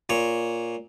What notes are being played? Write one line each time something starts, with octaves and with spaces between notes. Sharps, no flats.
A#2 C#5